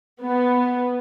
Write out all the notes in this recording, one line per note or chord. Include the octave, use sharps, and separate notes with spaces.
B3